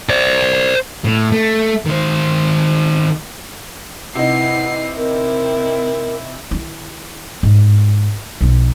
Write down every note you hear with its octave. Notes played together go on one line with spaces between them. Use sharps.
C5 D5
A2
A3
D#3 C5
C3 D#4 E4 B4 F#5 C7
C4 E4 A#4
D#3 E4
G#2
B1 F3